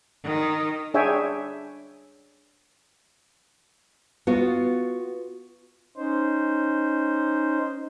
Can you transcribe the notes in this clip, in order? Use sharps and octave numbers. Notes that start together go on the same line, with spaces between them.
D#3
D4 G#4 C#5 E5 G5 G#5
B3 F4 F#4
C#4 D#4 C5